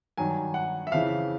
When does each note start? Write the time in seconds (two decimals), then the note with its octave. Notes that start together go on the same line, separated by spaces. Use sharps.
0.17 G2 D#3 F#3 G#5
0.54 F#5
0.87 E5
0.92 F2 C#3 E3 F5